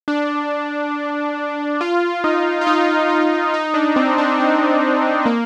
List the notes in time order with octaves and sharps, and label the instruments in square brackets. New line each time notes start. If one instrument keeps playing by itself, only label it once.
[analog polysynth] D4
F4
D#4
F4
D#4
F4
D#4
D4
C4
D4
C4
A#3